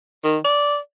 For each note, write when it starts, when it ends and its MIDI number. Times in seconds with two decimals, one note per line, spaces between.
0.24 0.38 51
0.45 0.78 74